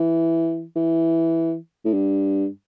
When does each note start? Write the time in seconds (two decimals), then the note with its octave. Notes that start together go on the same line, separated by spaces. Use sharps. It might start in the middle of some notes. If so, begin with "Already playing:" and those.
Already playing: E3
0.75 E3
1.85 A2
1.93 G2